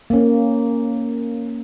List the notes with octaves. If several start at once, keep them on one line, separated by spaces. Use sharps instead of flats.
A#3 C#4